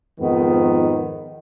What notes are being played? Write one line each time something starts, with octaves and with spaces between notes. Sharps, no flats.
F2 G#2 D#3 F3 B3